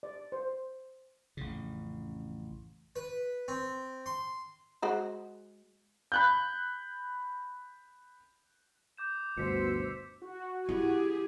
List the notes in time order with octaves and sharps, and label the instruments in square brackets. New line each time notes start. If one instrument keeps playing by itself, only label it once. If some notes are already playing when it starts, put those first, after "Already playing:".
[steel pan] D5
C5
[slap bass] A1 F2 C#3
[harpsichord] B4
C4
C6
[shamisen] G#3 F#4 C5
[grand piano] B5 F#6 G6
[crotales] D6 G6 E7
[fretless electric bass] G1 D2 [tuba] B2 [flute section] C5 E6 [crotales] B6 C#7
[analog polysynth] F#4
[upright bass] E4 [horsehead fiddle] G4 G#4